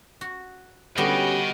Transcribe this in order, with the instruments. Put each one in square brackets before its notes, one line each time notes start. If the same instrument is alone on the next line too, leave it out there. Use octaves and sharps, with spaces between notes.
[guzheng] F#4
[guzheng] D3 G3 B3 [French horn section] C#4 G4 [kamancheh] F#4 [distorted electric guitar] D#5 G5